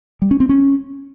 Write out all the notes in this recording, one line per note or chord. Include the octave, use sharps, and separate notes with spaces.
G3
C#4
C4
C#4